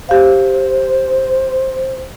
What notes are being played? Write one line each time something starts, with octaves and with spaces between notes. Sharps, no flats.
G4 C5 F5